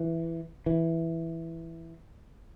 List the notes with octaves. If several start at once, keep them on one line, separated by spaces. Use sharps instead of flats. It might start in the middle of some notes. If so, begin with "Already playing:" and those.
Already playing: E3
E3